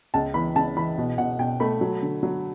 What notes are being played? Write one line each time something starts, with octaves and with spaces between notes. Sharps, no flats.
C#2 A5
E3 B5
C#2 A5
E3 B5
B2
B2 F#5
B2 G5
A3 B5
F#3
D3
F#3